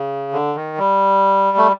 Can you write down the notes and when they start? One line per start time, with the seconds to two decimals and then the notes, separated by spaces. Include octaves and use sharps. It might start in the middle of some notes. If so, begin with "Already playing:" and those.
Already playing: C#3
0.33 D3
0.55 D#3
0.78 G3
1.57 A3